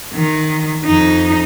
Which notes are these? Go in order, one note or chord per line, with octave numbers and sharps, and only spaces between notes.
D#3
F2 D#4